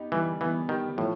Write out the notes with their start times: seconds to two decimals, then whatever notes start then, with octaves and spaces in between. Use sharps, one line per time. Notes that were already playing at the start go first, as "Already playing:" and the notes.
Already playing: B3 D#4 G4
0.12 E3 G3
0.41 E3 B3
0.69 D#3 G4
0.97 A2 F3